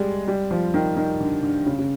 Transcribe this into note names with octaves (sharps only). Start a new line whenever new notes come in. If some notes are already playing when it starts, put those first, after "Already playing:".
Already playing: G3 G#3
G3
F3
D#3
D#3
D3
D3
C#3
C#3